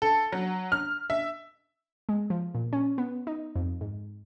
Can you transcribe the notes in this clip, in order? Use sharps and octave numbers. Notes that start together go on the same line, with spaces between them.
A4
F#3
F6
E5
G#3
F3
A#2
C#4
B3
D#4
F2
G#2